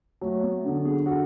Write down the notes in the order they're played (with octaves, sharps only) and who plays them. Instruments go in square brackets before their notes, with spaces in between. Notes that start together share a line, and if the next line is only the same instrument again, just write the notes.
[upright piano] F#3 [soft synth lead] A3
[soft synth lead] B3
[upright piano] D3 [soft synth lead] B3
[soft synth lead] G#4
[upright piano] F#4 [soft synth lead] A4